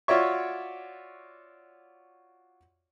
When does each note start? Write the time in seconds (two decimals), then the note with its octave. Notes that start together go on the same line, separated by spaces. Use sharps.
0.08 F4 F#4 C#5 D5 E5 C#6